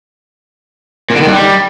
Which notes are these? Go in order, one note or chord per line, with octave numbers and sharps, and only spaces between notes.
A#2
D3
D#3
G2
G3